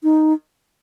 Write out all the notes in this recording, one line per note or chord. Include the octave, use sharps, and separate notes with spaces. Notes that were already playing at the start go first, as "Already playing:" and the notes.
D#4